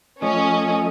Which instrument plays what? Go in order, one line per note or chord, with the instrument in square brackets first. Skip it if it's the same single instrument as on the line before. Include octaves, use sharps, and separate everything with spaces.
[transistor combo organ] F3 A3 D#5 [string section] C#4